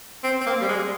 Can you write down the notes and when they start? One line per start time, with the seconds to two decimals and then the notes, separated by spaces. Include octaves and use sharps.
0.24 C4
0.41 C4
0.46 A#3
0.61 G3
0.69 G#3